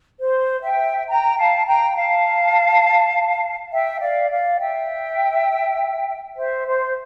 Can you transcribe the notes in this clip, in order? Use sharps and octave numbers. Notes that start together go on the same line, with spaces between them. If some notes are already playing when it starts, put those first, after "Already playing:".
C5
E5 G5
G5 A#5
F5 A5
G5 A#5
A#5
F5 A5
E5 G5
D5 F5
D5 F5
E5 G5
C5 E5
C5